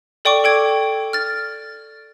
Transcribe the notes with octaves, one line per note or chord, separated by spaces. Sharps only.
A4 D5 G5 C#6 D6
A4 G5 G#6
F6 A6